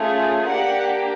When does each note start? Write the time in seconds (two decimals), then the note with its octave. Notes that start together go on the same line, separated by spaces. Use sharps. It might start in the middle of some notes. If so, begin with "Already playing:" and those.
Already playing: A3 C#4 F4 G#4
0.47 A#3 D4 G4 F#5